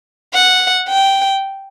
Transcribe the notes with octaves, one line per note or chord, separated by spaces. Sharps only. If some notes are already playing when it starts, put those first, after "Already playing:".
F#5
G5